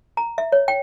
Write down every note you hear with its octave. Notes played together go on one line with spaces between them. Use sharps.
A#5
E5
C#5
G5